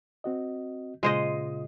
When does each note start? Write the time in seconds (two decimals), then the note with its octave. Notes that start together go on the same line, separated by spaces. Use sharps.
0.24 C4 F#4 D#5
1.03 A#2 C#3 G#3 F4 C5 D#5